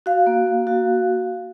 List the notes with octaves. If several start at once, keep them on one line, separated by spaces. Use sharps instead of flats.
F#4 F5
A#3
A#3
F#4